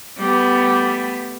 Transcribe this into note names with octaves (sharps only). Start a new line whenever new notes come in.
G3 A3 B3